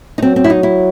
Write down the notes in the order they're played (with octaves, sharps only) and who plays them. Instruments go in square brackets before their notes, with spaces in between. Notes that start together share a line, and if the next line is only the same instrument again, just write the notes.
[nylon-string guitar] D#4
[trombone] F#3 [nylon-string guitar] C4
[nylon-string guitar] C4
E4
D#4
E4